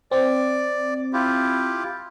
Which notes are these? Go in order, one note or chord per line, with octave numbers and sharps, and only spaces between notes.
C4 D5
E4 F4 G4